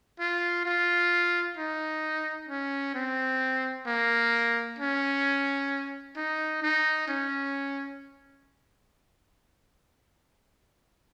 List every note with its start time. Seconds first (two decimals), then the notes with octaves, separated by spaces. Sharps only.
0.20 F4
0.66 F4
1.57 D#4
2.49 C#4
2.94 C4
3.87 A#3
4.78 C#4
6.16 D#4
6.62 D#4
7.08 C#4